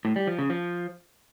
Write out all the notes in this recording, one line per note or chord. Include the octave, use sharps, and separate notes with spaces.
A2
G3
F3
C#3
F3